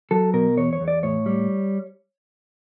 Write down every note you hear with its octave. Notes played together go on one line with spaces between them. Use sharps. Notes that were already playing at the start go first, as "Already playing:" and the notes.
F#3 A4
B2 A#4
E2 C#5
C#5
E2
D5
A2 C#5
G3